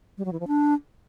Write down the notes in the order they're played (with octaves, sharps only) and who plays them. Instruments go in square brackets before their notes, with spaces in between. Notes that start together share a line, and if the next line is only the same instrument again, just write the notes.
[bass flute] G3
F#3
E3
F3
D4